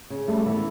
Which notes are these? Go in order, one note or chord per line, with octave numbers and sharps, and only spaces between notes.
C#3
G3 A3
E3 B3